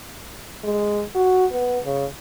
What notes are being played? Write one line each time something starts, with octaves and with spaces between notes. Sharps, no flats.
G#3
F#4
B3
C#3